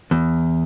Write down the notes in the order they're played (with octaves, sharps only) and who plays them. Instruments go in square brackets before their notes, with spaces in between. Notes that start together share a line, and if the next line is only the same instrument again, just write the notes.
[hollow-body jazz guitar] E2